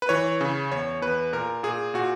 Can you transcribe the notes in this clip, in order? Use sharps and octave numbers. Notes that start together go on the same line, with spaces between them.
B4
E3 C#5
C#3
E2 C#5
E2 B4
A#2 A#4
A#2 G#4
A#2 F#4